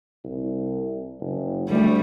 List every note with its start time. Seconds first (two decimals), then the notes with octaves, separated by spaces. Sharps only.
0.24 C2
1.20 F#1
1.69 D2 G3 A3